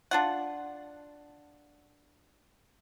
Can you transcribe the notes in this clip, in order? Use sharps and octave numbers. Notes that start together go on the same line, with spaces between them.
D4 F4 F#5